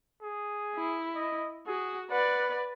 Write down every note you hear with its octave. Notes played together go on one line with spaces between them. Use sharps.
G#4
E4
D#5
F#4 G#4
B4 D5 F#5